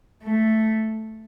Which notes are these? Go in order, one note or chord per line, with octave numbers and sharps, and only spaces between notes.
A3